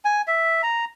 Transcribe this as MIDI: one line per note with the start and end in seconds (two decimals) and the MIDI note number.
0.05 0.22 80
0.27 0.62 76
0.63 0.85 82